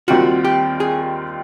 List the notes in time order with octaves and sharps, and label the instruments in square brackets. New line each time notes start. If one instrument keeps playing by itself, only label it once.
[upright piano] D#2 D#3 G3 C4 F4 [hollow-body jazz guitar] F#4
[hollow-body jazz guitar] G4
G#4